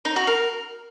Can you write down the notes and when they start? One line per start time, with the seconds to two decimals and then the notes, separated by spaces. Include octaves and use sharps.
0.05 D#4
0.16 F#4
0.27 A#4